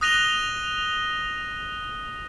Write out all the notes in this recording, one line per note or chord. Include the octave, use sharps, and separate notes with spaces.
D#6 F#6 A#6 D#7 F7 G7